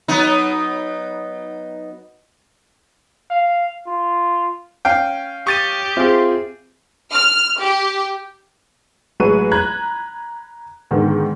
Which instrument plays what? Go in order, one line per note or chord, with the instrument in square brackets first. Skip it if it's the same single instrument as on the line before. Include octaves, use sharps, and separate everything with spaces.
[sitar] F#3 B3 D#4
[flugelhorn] F5
F4
[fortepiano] C#4 F5 G5
[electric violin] G4 [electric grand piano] C#6 A6 D#7 [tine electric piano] D#6
[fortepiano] C4 G#4 [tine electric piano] F4 E5 F5
[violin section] F6
G4
[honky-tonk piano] A1 F#3 G#3 B4 C#6 D#7
A#5 B5 F#6 G#6
G#2 D3 D#3 B3